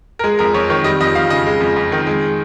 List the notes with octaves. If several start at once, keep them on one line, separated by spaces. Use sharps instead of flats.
A#4
G#3 G#4
F2 A#4
F2 C#5
D#3 C#5
G3 D#5
F2 D#5
F2 F5
C#3 D#5
G#3
F2
F2
D#3
G#3